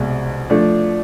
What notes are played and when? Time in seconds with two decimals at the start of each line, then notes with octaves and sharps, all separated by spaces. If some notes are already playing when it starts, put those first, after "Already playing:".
Already playing: C2 B2 G#3
0.50 F3 A3 D4